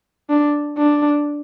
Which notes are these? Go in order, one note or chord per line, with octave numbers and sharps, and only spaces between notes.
D4
D4